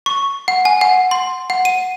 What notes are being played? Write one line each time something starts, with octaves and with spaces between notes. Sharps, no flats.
C#6
F#5
G#5
F#5
C6
F#5
D#7